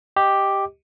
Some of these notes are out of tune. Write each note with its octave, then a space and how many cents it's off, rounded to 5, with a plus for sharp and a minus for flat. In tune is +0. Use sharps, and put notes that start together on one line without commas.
G4 +0 D#5 +0